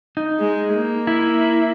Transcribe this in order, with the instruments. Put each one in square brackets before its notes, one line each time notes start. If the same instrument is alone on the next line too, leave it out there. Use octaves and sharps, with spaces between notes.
[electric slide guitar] D#4
[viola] G#3
A#3
[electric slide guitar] E4